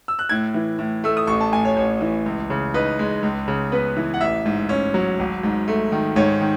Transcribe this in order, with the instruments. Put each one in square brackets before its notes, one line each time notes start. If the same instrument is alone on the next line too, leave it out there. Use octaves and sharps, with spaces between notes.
[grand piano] E6
F#6
A2 G#6
E3
A2
A3 E6
D#6
A1 C#6
A5
A2 G#5
C#5
A1 C#5
E3
C#2
C#3
D#4 B4
G#3
C#2
C#3
B3 B4
E3
F#5
A1 E5
G#2
C#4
F#3
G#1
G#2
A3
D#3
G#2 C#5
D#3